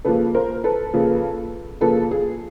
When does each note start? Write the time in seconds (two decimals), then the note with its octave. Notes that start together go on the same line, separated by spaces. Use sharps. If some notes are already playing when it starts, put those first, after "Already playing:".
0.05 C#3 F3 A#3 A4 B4
0.35 A#4 C5
0.64 A4 B4
0.93 C#3 F3 A#3
1.81 C#3 F3 A#3 A4 B4
2.11 G#4